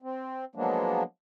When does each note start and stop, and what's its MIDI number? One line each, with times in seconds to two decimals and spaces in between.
0.02 0.45 60
0.55 1.03 53
0.55 1.03 54
0.55 1.03 56
0.55 1.03 58
0.55 1.03 59
0.55 1.03 62